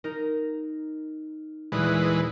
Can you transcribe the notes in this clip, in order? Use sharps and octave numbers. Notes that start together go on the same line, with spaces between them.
D#4 A#4
D#1 E3 G#3 B4 D#6 F#6